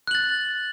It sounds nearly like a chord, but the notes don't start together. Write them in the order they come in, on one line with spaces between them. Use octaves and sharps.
F#6 F#7 A6